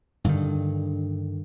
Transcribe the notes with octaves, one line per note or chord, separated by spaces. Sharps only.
G2 D3 D#3